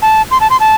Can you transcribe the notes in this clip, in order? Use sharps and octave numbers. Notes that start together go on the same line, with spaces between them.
A5
C6
A5
C6
A5